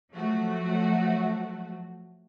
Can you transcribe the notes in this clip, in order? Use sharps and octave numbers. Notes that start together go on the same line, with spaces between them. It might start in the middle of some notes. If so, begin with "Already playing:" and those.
F3 F#3 A3 F#4